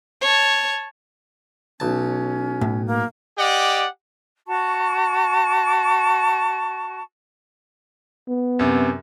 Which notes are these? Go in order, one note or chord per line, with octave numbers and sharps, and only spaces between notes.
C#5 A5
B1 C#4 A5
A2
A#3
G4 D5 D#5 F#5
F#4 A5 C#6
B3
F#2 C3